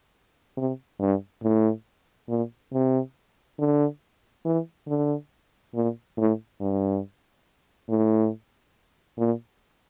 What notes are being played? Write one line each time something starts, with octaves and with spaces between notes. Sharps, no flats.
C3
G2
A2
A#2
C3
D3
E3
D3
A#2
A2
G2
A2
A#2